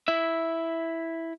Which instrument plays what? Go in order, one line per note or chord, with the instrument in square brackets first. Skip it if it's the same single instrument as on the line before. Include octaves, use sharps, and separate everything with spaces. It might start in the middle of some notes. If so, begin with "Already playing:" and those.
[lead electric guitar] E4 E5